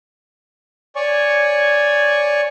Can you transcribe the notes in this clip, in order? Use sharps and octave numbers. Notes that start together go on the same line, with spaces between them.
C#5 D5 G#5 C#6